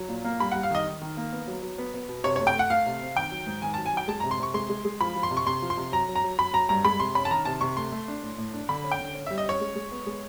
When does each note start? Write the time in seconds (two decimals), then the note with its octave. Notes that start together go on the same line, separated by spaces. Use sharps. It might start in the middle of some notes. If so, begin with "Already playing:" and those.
Already playing: F#3
0.09 A#2
0.25 A#3
0.40 G3 B5
0.52 G3 F#5
0.63 F5
0.71 D#3 D#5
0.87 D#3
1.02 D#3
1.17 A#3
1.33 B3
1.47 F#3
1.62 F#3
1.78 B3
1.94 B3
2.09 B2
2.24 C3 C#5
2.36 A3 C#5
2.47 G5
2.55 A3 F#5
2.70 A3 F5
2.86 C3
3.02 C4
3.16 D#3 G5
3.31 F#3
3.46 G#2
3.62 D#3 G#5
3.74 F#3 A5
3.86 G#5
3.93 F#3 G5
4.08 G#3 A5
4.20 C3 A#5
4.31 C6
4.40 C3 C#6
4.54 G#3 C6
4.70 G#3
4.85 G#3
5.01 F3 B5
5.16 F3
5.23 C6
5.31 C3
5.37 C#6
5.46 C3 C6
5.62 F3
5.70 C6
5.77 C3
5.92 F#3 A#5
6.08 F#3
6.15 A#5
6.24 F#3
6.38 F#3 B5
6.53 F#3 A#5
6.69 G2 A#5
6.85 G#3 B5
7.00 C3 C6
7.15 C#4 B5
7.25 A5
7.31 D#3 A#5
7.45 C3 A5
7.61 C3 C#6
7.76 A3 C6
7.92 A3
8.08 D4
8.23 A2
8.38 A2
8.53 D4
8.69 D3 B5
8.84 C#4
8.92 G5
8.99 D3
9.15 C#4
9.27 G3 E5
9.38 D#5
9.45 C#4 C#5
9.61 G#3
9.76 G#3
9.92 B3
10.06 G#3